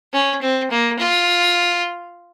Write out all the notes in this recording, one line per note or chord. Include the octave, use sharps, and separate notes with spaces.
C#4
C4
A#3
F4